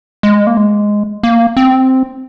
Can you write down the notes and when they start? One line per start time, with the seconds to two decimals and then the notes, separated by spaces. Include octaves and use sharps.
0.23 G#3
0.47 A#3
0.57 G#3
1.23 A#3
1.57 C4